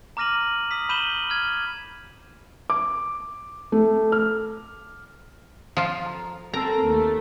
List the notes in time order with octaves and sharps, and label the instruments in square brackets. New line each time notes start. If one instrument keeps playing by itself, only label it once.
[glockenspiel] A#5 D6 F6 A#6 D#7 F#7
D#6 B6
B5 G6 D#7 E7 F#7 G7
F6 G#6
[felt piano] D6
A3
F6
[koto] F3 F4
[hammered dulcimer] A#5
[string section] C4 [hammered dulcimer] A4 A#4 [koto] A#5
[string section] D#2 A3